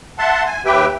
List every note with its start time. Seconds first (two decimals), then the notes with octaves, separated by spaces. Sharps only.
0.18 E5 F#5 A5 C6
0.46 G#5
0.65 D#2 G4 B4 E5 G5